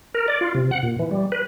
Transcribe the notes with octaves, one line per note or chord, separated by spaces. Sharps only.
A#4
D5
F4
C3
F#5
A#2
E3
G3
B4